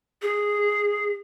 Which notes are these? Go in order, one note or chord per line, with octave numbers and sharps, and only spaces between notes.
G#4